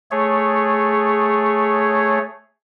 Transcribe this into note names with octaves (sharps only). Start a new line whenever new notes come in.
A3 G#4 C#5